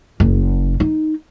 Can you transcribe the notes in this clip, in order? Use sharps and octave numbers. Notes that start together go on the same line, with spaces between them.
F#1
D#4